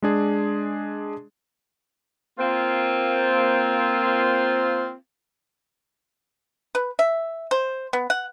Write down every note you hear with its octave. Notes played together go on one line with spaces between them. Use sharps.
G#3 D4 G#4
A#3 C4 F4
B4
E5
C5
B3
F#5